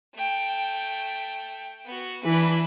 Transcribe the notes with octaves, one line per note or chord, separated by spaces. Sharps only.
A3 G5
B3 F#4
E3 D4 B4 B5